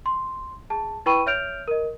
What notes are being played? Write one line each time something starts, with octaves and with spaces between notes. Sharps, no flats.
C6
G#4 A5
E4 B4 G5 B5 C#6 D#7
C#5 E5 F6 G6 D7 F7
A#4 D#5